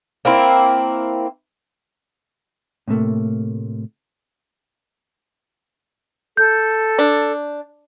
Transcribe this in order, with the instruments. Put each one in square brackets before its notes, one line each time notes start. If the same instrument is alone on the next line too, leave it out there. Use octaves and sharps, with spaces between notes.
[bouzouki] A#3 C4 E4
[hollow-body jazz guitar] A2 C3 A3 A#3
[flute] A4 [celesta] G6
[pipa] D4